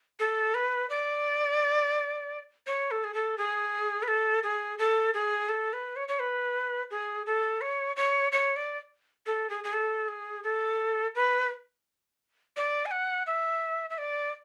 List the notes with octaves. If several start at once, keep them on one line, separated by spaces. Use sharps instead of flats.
A4
B4
D5
C#5
A4
G#4
A4
G#4
B4
A4
G#4
A4
G#4
A4
B4
C#5
C#5
B4
G#4
A4
C#5
C#5
C#5
D5
A4
G#4
G#4
A4
G#4
A4
B4
D5
G#5
F#5
E5
E5
D5